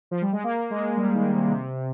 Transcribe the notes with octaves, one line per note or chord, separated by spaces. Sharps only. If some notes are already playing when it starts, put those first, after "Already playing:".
F3
G3
G#3
A#3
G#3
G3
D#3
C3
C3